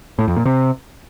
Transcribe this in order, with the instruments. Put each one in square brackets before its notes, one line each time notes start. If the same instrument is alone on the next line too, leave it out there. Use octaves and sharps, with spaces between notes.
[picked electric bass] A2
F2
A#2
C3